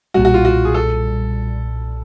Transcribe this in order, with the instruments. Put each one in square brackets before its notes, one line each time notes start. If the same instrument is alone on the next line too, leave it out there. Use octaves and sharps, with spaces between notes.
[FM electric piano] B1 A#2 G3 [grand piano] F#4
[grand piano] F#4
F4
F#4
G#4
A4